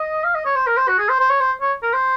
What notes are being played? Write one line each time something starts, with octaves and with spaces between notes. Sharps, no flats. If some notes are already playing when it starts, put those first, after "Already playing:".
Already playing: D#5
F5
D#5
C#5
C5
A#4
C5
F#4
G#4
C5
C5
C#5
C5
C#5
A#4
C5